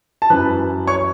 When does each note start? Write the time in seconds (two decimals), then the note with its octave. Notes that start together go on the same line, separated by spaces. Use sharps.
0.22 A5
0.30 F#2 E3 B4 B5
0.87 C#5 C#6